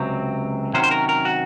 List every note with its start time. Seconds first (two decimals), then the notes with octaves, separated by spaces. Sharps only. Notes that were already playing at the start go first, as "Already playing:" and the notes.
Already playing: C#2 C3 F#3 C4
0.74 C3 D#3 F#3 C#4 C5
0.84 C5
0.91 A#4
1.09 A#4
1.25 F#4